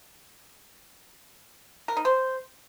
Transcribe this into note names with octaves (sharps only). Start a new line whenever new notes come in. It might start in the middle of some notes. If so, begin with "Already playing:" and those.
A#4
D#4
C5